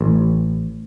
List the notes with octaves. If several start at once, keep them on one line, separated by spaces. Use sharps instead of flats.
A1